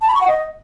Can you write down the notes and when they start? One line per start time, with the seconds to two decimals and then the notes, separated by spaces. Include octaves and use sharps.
0.02 A5
0.08 B5
0.15 C#6
0.21 F#5
0.27 D#5